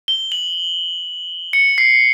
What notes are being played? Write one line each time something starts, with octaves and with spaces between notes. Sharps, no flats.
G7
F#7
C#7
C7